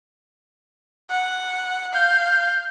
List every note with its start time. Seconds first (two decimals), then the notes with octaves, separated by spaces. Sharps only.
1.10 F#5
1.94 F5 G6